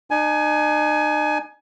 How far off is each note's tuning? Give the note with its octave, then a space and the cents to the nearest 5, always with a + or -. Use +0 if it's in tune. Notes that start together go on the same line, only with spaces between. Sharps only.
D#4 -40 G#5 +20